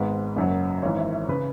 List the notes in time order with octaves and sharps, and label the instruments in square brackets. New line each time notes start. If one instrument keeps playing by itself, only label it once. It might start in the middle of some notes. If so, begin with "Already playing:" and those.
Already playing: [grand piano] G#1 G#2 G#3 B3 B4
F#1 F#2 F#3
G#1 G#2 E3 C#5
E5
E5
C#3 B4